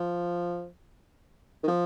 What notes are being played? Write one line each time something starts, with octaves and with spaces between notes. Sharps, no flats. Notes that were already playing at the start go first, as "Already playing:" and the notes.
Already playing: F3
D#3
F3